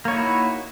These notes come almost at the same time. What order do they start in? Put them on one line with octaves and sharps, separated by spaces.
A#3 C#5 D#4 E4 F#4